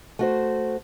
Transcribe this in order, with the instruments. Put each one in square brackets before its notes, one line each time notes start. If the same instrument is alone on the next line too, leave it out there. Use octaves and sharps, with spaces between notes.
[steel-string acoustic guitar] A3 F#4 C5